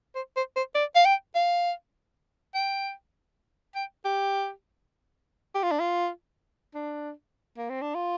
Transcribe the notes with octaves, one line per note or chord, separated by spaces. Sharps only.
C5
C5
C5
D5
F5
G5
F5
G5
G5
G4
G4
F4
D4
F4
D4
A#3
C4
D4
F4